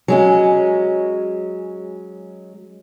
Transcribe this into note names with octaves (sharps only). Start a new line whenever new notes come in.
F#3 G#3 C#4